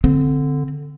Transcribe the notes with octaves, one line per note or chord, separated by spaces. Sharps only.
D3 C4